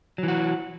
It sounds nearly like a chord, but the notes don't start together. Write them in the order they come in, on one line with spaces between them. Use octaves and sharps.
F#3 E3 F#4